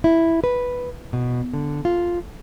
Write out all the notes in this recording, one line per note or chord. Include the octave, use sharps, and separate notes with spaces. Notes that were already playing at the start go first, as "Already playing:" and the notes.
E4
B4
B2
D3
F4